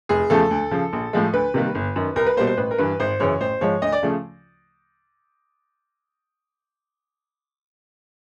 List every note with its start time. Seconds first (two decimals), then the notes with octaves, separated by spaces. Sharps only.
0.09 F1 G#4
0.30 E2 C#3 F3 A3 A4
0.51 D2
0.71 C#3 F3
0.93 A#1
1.13 A2 F3 G#3
1.33 D2 B4
1.54 C3 D#3 G3 A#3
1.75 G1
1.96 F#2 D#3
2.16 C2 A#4
2.27 B4
2.37 B2 G3 A#3 C5
2.47 C5
2.57 A1 B4
2.71 A#4
2.78 G2 E3 B4
3.00 G#1 C5
3.20 F#2 C#3 E3 C#5
3.40 A1 C5
3.61 G#2 F3 G#3 C#5
3.82 D2 D#5
3.92 D5
4.03 C#3 F3 A3